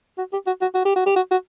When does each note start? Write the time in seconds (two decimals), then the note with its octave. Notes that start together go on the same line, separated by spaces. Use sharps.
0.18 F#4
0.33 G4
0.47 F#4
0.61 F#4
0.75 F#4
0.85 G4
0.96 F#4
1.06 G4
1.16 F#4
1.31 F#4